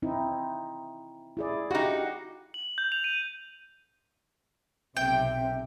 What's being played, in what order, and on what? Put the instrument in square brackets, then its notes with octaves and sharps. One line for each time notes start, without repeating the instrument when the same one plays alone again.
[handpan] C4 D#4 E4
E4 G#4 D5
[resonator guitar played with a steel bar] D#4 F#4 [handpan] G4 F5
[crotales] F#7
G6
F7
D#7
[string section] B1 C3 [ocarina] E5 [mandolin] G5